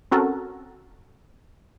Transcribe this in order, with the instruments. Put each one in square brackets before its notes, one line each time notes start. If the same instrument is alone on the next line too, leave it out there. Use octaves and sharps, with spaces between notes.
[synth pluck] C4 C#4 F#4 A4 A#4